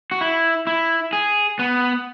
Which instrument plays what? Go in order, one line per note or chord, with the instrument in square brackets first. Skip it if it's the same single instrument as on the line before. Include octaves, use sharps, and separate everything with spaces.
[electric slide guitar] F#4
E4
E4
G#4
B3